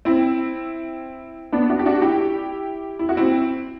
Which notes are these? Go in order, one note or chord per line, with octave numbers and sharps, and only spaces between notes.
C4 E4
B3 D4
D4 F#4
G4
D4 F#4
E4 G4
E4
F#4
C4 E4